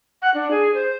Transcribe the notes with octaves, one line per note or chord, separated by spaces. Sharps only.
F#5
D4
G#4
C5